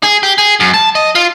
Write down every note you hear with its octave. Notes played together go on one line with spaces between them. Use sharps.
G#4
G4
G#4
F#2
A5
D#5
F4